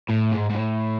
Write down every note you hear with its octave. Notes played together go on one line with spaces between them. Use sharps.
A2
G#2
G#2
A2